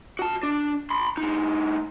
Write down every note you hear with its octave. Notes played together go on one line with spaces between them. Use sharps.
F#4 A5
D4
B5 C6
A2 D#4